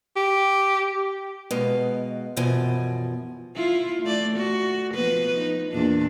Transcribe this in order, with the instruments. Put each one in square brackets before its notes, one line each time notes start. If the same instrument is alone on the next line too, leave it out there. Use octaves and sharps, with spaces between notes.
[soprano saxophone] G4
[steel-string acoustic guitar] B2 G#3 B4 F5
F#2 B2 E3 F3 G#5
[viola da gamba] E4 F4
A3 D5
F#4
F3 B3 B4
D#4
E2 A#2 D4